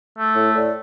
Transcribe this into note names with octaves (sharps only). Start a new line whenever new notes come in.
A3
A2
A2 D5